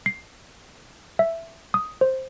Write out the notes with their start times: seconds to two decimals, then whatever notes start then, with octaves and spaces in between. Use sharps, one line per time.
0.06 C7
1.19 E5
1.74 D#6
2.01 C5